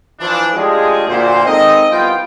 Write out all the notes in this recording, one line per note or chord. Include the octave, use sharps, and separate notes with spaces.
E3 F3 D4
G#3 A3 D4 F4 G4 G#4
D2 A#2 C5
G#3 C4 D#4 A4 A#4 D#5
C2 B3 F4 G5